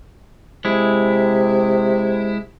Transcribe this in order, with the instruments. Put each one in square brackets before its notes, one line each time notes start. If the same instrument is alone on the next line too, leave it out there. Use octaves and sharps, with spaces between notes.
[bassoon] C3 [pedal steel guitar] G#3 E4